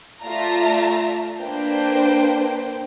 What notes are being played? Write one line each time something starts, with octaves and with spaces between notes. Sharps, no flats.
A3 F4 D5 E5 A5 A#5
A#3 D4 B4 C5 G5